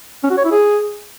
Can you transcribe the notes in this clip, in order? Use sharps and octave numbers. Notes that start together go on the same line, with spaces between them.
C#4
F#4
C#5
E4
G#4